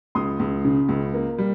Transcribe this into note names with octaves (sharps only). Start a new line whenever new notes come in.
C#2 C6 D#6
C#2
C#3
C#2
A#3
G3